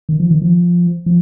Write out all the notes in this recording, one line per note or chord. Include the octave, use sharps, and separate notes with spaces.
D#3
F3
D#3
F3
F3